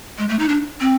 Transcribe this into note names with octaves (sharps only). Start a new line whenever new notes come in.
G#3
A3
D#4
D4
C4